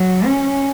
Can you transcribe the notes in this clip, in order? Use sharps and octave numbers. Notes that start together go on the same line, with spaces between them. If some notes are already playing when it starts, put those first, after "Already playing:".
Already playing: F#3
C#4